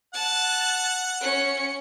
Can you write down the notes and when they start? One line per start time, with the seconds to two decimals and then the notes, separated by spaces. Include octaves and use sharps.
0.14 F#5 A5
1.21 C#4 C#7